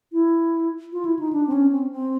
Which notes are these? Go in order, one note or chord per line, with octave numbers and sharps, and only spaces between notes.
E4
F4
E4
D#4
D4
C4
C#4
C4
C4